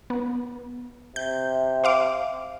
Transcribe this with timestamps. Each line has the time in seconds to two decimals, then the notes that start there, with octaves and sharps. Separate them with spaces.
0.10 B3
1.16 C3 G6
1.84 C5 F5 D6